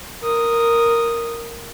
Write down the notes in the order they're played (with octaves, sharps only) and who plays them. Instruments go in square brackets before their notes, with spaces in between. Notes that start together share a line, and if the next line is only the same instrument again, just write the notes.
[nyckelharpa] A#4 D#6